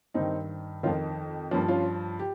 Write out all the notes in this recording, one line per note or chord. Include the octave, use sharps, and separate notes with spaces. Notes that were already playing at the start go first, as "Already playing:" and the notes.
G2 D#3 C4 D#4
F2 D#3 C#4 F4
G2 F3 A#3 C#4
C#4 F4
G4